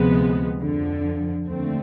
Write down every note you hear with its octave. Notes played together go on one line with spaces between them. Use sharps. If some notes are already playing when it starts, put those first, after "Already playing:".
Already playing: D2 C3 F3 G#3 B3
F2 D3 F3
D#2 D3 F3 A3 C4